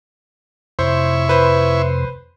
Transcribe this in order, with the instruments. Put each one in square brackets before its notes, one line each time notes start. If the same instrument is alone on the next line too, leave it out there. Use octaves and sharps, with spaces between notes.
[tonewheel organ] F2 C3 C6 [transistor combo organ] E4 C#5 [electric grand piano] C5
[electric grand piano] B4 C5